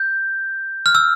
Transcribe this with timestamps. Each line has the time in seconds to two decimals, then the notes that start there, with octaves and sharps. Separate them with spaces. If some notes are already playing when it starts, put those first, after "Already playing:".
Already playing: G6
0.86 F6
0.95 E6